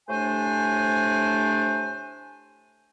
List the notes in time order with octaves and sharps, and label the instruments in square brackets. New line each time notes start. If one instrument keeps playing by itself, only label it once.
[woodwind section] A2 C3 A3 D4 C5 G#5